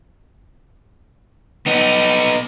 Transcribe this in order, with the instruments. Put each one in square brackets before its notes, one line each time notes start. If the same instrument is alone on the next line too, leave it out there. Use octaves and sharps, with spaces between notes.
[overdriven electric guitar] B3 D#4